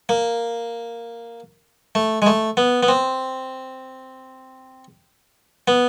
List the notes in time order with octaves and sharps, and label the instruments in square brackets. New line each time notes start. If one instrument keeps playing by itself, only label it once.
[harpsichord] A#3
A3
G#3
A3
B3
B3
C4
B3